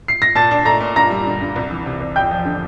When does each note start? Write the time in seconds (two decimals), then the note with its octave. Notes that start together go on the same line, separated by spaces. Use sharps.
0.08 C7
0.22 A#6
0.35 A#2 A5 A6
0.51 D4
0.65 A3 A#5 A#6
0.81 A#2
0.96 G2 A#5 A#6
1.10 G3
1.26 D3
1.41 G2
1.56 C2
1.71 E3
1.86 C3
2.00 C2
2.16 E2 G5 G6
2.31 F3
2.45 D3